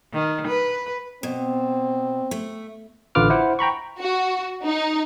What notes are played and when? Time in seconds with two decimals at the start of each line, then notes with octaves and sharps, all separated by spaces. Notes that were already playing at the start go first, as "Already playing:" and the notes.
0.13 D#3
0.47 B4
1.23 B2 C4
2.31 A3
3.15 A1 D3 F4 B4 D6 F6
3.30 E4 C5 F#5
3.59 G5 A#5 B5 C#6
3.98 F#4
4.64 D#4